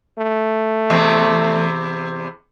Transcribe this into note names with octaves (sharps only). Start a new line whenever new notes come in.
A3
E2 C3 C4